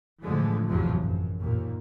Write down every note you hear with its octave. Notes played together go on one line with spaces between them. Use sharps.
A2 D3 E3 F3 G#3 A3
A1 E2 G#2 C3 F3 F#3
F#2
D#2 A#2